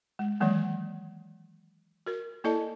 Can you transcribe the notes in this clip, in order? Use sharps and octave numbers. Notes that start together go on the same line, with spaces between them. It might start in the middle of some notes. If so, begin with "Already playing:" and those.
G#3
D#3 E3 F#3 G#3 A#3
F#4 A#4
A#3 E4 A4 D5 D#5 A5